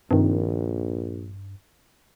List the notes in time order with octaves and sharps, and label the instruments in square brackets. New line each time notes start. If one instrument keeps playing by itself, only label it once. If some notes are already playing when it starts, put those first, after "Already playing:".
[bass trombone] A#1 [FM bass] G2 [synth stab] C3 D#3